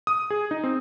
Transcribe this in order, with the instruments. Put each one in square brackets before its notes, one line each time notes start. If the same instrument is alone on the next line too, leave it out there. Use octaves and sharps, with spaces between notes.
[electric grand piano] D#6
G#4
D#4
C4